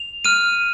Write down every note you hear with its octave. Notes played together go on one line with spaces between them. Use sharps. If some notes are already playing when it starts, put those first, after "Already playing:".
Already playing: F7
F6 D#7